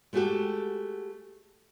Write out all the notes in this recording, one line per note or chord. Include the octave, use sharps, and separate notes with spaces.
G#3 A3 B3 F#4 G4 A4